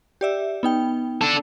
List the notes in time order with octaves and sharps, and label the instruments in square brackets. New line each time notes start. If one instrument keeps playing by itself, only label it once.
[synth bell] G4 D5 E5
B3 D#4 G5
[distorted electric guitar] D4 A4